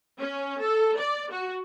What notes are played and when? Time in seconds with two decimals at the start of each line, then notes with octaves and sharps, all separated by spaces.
0.20 C#4
0.61 A4
0.97 D5
1.31 F#4